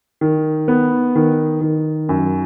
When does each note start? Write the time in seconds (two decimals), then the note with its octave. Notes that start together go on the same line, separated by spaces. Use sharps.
0.21 D#3
0.68 B3
1.15 D#3
1.61 D#3
2.09 F#2